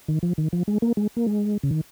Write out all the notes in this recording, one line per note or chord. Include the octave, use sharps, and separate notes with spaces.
D#3
F3
D#3
F3
G#3
A#3
G#3
A#3
G#3
C#3
D#3